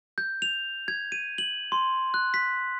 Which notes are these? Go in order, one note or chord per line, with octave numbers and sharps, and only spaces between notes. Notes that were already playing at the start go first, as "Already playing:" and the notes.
G6
F7
G#6
D#7
F#7
C6
F#6
B6